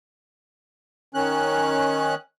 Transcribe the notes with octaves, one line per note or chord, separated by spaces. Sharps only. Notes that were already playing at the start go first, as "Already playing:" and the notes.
D#3 C#4 F#6